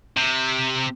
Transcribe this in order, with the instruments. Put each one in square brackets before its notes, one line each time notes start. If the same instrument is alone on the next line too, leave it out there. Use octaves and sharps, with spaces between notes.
[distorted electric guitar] C3